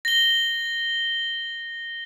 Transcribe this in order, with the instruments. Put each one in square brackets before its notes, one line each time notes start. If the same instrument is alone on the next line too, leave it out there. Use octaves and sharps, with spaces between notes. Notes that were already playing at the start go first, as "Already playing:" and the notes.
[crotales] A#6 G7